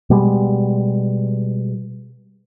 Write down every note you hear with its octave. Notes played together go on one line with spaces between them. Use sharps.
B2 G3 G#3